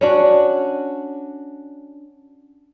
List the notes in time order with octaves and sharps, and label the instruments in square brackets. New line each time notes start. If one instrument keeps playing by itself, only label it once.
[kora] C#4 D4 F#4